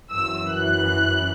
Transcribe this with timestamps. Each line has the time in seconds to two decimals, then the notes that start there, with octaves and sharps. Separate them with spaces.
0.13 F#2 E3 E6
0.53 F#6